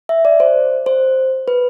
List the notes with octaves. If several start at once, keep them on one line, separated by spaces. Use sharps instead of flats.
E5
D5
C5
C5
B4